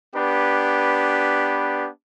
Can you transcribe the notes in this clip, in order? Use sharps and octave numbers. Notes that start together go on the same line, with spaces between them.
B3 D4 G4 B4